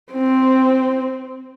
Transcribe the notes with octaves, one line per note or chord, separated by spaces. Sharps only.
C4